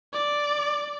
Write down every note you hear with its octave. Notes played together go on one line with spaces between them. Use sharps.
D5